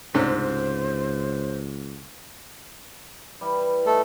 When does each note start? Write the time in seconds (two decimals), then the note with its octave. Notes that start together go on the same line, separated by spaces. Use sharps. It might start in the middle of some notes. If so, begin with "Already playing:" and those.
0.14 C#2 G#2 C3 A3 C#4 D4 C5
3.41 E3 G3
3.86 A3 D#4 A4